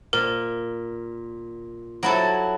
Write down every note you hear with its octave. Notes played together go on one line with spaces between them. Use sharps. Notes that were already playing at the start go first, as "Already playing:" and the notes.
A#2 A#4
F#3 E4 A4